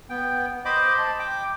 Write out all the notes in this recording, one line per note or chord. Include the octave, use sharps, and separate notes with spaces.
B3 G5
C5 D#5 B5 D6
A5
G5 D6